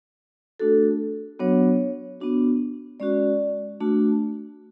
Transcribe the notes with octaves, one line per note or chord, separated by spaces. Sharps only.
A3 D4 F#4 A4
F#3 B3 D4 F#4 C#5
B3 D4 F#4
G#3 C#4 F#4 D5
A3 D4 F#4